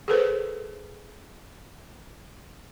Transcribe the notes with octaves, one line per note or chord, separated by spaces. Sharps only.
G#4 A4 B4 C5